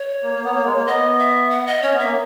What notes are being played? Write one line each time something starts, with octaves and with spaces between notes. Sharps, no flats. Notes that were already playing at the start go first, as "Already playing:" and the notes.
Already playing: C#5
A#3
A#3
B3
A#3
G#3
A#3
B3 D#5
E5
F#5
D#5
C#4 C#5
B3
A#3 E5